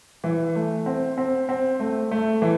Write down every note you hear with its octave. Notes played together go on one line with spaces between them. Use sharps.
E3
A3
C4
C4
C4
A3
A3
E3